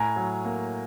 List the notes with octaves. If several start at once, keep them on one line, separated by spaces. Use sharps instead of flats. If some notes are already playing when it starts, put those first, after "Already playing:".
Already playing: A2 G#5 A#5
F#3
A#3